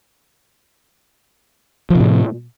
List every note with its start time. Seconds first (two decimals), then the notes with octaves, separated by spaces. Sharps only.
1.90 F3
1.95 C3
2.00 A2